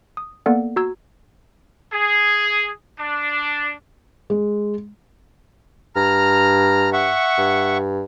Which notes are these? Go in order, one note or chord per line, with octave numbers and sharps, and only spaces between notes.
D#6
A#3 B3 A4 D5 F#5
F#4 A#5 E6 G#6
G#4
D4
G#3
G2 A#5 F6
E5 F#5 C#6
G2